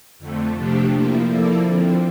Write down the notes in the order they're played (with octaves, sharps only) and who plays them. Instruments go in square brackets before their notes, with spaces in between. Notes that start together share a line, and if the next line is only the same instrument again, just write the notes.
[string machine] F2 D3 A3
C3 F3 A3 D4 G4
F3 A#3 E4
F3 A#3 E4 A4 D5
D3 F3 C4